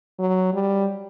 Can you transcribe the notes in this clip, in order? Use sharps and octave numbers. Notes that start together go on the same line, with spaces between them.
F#3
G3